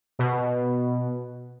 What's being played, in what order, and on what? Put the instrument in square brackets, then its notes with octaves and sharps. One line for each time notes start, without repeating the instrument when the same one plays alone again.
[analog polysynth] B2